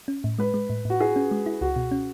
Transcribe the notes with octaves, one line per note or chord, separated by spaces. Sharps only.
C#4
A2
G#3 B4
G#3
A2
A2 F#4
E4 G#4
C#4
G#3
E4
C#2 F#4
B2
C#4